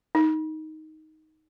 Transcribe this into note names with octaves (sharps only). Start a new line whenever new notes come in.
D#4